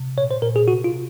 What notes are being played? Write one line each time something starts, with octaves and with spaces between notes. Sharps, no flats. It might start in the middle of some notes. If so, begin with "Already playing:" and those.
Already playing: C3
A#2 C#5
C5
A#2 A#4
G#4
C3 F#4
F4
C3